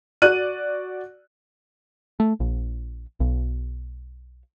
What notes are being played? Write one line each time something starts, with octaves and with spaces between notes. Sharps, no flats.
F#4 D5 F#6 D#7
A3
A#1
B1